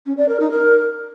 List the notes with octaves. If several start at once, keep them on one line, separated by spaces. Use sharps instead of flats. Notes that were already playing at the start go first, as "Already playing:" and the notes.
C#4
D5
A#4
D#4
A#4